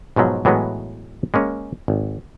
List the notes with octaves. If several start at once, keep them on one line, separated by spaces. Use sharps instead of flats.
G#2 B2 F3 F#3
A2 E3 F#3 G#3 B3
G#3 A#3 C#4
G#1